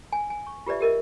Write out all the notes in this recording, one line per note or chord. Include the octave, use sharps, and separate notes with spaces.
G#5
G#5
C#6
F4 G4 B4 D5 E5
G4 A#4 D#5 E5